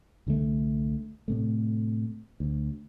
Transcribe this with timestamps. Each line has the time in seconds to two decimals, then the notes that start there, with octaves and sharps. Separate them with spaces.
0.27 C2 D3 F#3 A3
1.28 A2 C3 A3
2.40 D2